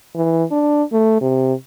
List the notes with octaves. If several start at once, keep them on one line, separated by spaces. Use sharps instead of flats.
E3
D4
A3
C3